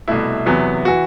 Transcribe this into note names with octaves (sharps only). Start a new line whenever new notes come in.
C2 B2 A3 E4
E2 C3 F#3 B3
E3 F#4